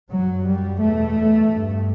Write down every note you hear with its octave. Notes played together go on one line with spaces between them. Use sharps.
F#2 F#3
G3
E2 B2 A3
G2